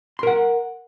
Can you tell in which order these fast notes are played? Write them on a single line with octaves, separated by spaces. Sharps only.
C6 A#4 F#5